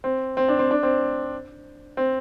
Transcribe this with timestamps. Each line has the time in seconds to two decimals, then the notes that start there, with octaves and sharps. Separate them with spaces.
0.04 C4
0.37 C4
0.48 D4
0.59 C4
0.71 D4
0.83 C4
1.97 C4